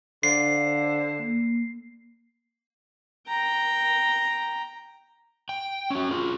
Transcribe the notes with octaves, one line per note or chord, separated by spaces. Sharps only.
D3 C5 F5 C7
A#3
G5 A#5
G5
C#4 F#4
F4 G#4